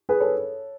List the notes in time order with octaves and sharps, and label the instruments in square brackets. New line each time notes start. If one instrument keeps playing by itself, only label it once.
[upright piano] G#4 B4
A4 C#5